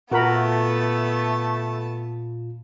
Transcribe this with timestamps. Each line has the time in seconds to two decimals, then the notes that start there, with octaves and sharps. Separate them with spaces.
0.12 A#2 A3 B3 F4 F#4 A#4 A5 B5